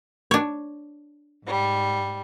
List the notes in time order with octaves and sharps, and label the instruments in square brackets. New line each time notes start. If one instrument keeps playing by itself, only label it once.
[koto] D4 C#5
[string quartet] G#2 G3